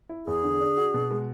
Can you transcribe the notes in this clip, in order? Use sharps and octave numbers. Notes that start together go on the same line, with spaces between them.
E4
E2 G#4
D3
D4
F#4
B2
G#3